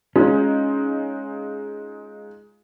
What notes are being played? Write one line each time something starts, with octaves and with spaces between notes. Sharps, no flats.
G#3 C#4 D#4 F4